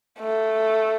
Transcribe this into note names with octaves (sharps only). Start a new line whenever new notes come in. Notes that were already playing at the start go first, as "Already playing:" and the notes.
A3